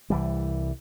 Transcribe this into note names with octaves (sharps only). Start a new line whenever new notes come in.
C2 E3 G3